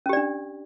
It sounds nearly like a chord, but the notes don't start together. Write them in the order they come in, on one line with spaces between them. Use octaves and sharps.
C#4 G4 D5 D4